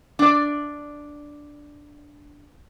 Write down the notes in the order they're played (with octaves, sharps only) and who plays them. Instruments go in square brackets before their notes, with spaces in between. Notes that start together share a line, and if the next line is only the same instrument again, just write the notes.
[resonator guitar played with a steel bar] D4 D5